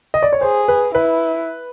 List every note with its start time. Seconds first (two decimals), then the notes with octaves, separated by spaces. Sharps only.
0.14 D#5
0.22 D5
0.33 C#5
0.41 G#4 C5
0.68 B4
0.94 E4 B4